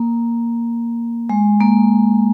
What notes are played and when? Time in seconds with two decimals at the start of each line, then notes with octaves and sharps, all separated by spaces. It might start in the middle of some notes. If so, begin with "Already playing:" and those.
Already playing: A#3
1.29 G#3
1.61 A#3